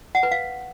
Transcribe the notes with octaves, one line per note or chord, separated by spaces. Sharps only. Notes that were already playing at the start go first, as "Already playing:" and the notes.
F#5
B4
F5